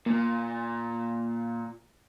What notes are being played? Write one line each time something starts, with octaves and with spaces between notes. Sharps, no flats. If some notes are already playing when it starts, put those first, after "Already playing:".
A#2 A#3